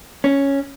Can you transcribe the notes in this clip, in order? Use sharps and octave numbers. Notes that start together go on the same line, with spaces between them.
C#4